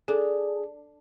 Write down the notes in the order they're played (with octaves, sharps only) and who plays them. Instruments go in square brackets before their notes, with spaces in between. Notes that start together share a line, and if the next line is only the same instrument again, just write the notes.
[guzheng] D4 [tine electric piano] G#4 [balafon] A4